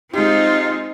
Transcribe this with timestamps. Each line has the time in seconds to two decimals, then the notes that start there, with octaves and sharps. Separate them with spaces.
0.13 G#3 C4 D#4 F4 G4